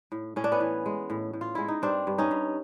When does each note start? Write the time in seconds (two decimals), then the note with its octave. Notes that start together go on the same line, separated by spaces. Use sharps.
0.12 A2
0.36 A2 C#4
0.44 D4
0.52 B3 C#4
0.60 E3
0.86 G#3
1.10 A2
1.33 A2
1.41 F4
1.55 G#3 E4
1.68 D#4
1.82 G2 C4 D4
2.07 G2
2.18 C#4 D#4
2.31 G2